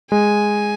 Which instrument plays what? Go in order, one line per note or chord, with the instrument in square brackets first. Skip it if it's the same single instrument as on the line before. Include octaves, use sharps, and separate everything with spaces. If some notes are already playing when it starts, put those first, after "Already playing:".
[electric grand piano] G#3 [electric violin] G#5